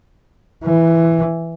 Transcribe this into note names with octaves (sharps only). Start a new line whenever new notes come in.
E3